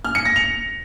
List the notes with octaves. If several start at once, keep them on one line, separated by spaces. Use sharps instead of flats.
F6
C#7
A#6
F7